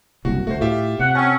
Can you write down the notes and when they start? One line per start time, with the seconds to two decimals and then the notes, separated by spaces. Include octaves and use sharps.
0.25 F#1 C2 F#4
0.47 D2 A3 F#4 C5
0.61 A2 F4 G4 E5
0.99 C3 F#5
1.15 C4 C#4 F#5 A5